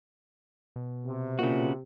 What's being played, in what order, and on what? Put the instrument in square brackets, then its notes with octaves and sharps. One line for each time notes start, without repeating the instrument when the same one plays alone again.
[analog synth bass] B2
[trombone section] C3
[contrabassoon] A#2 [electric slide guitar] C#3 F#4